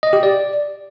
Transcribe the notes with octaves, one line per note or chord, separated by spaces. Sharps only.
D#5
G4
D5